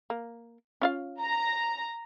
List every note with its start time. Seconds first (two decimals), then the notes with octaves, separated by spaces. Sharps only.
0.10 A#3
0.81 C#4 F4 F5
1.22 A#5